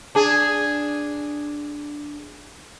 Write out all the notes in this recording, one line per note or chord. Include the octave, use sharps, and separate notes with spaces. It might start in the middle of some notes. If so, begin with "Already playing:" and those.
D4 G#4